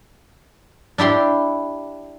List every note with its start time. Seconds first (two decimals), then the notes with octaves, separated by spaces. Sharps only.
0.98 D4 E4 G4 C6